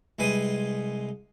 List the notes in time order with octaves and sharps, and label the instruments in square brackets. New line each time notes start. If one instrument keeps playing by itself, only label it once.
[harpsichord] C2 G#3 B4 G#5 C6 D#6